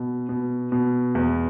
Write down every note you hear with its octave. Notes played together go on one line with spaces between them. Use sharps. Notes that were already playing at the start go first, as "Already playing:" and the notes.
Already playing: B2
B2
B2
E2